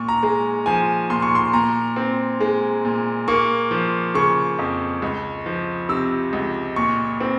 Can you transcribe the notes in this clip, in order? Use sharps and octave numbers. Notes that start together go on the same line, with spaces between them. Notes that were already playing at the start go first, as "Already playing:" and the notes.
Already playing: A#2 C#6
A#5
G#3
F3 G#5
A#2 C6
C#6
C6
A#2 A#5
C4
G#3
A#2
A#3 C#6
F3
C#3 C#6
F2
C#2
F3
C3 E6
C#2
A#2 C#6
C4